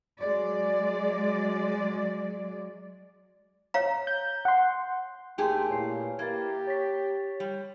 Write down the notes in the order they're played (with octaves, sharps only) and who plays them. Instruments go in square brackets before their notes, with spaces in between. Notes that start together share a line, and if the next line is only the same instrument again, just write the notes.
[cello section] F#3 G#3 D5
[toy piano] C#5 F5 A#5
[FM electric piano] G6
F#5 C6
[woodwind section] D#2 [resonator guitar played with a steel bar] A3 G4 G#4 [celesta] G5 C6
[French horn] A#2 [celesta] E4 G#5 C7 [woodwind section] B4 C#5 F5
[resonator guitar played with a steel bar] A#3 [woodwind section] E4 A#4 [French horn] G4 [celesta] G#6 A6
[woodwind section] C#5 [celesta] A6 B6
[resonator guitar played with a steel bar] G3